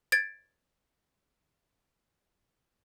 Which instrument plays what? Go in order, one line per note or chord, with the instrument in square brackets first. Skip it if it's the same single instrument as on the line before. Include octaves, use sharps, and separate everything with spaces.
[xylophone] G#6 A6 D7